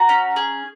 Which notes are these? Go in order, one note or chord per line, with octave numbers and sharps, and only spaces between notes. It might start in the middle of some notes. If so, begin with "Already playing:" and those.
Already playing: F#4 A#5
C#4
G#4